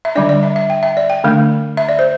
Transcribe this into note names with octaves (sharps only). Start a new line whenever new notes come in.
E5
D3 G3 D4 D5
D5
E5
E5
G5
E5
D5
G5
D3 A3 D4
E5
D5
C5